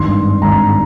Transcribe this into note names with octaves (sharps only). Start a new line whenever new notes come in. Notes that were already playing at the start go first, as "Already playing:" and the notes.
Already playing: G#1 G2 D#3 C6
G#1 G2 D#3 A#5